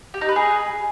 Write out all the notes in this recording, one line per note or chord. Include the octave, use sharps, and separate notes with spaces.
G4
D#4
B4
G#4